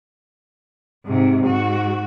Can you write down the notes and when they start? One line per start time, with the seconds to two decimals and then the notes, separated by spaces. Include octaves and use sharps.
1.05 G#2 C3
1.45 G#2 F#4